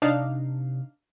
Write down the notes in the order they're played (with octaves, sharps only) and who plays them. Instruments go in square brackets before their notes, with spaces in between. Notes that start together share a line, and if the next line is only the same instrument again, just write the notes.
[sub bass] C3 [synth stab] D4 D#4 F5